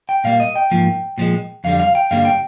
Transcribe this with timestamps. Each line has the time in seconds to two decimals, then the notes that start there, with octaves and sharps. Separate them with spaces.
0.09 G5
0.24 A#2 G3 A#3 F5
0.40 D#5
0.56 G5
0.71 G#2 F3 A#3
1.18 A#2 F3 G#3
1.64 F2 D3 G3 F5
1.80 F5
1.95 G5
2.11 G2 D3 G3 A#3 F5
2.25 G5